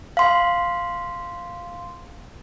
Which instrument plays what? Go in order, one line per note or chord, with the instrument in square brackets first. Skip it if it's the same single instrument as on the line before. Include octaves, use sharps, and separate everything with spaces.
[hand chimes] F5 C6